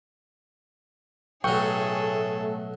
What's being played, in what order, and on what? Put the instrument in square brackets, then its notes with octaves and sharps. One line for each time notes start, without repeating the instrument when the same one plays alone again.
[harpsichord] B1 F#3 [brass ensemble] A2 A3 [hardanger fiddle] G#4 A4 [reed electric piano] G5 C#6